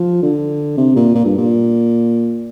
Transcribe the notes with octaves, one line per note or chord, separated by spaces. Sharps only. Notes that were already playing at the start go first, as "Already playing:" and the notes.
Already playing: F3
D3
C3
A#2
A#2
G2
A#2